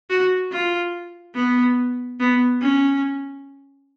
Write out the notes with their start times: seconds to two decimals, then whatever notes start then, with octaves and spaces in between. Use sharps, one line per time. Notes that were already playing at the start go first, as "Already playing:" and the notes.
0.10 F#4
0.52 F4
1.35 B3
2.20 B3
2.61 C#4